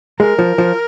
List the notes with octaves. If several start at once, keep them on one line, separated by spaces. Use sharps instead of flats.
G#3 A#4
F3
F3